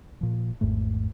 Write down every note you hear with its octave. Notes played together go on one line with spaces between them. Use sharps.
A#2 F3
G#1 E2 G#2 A3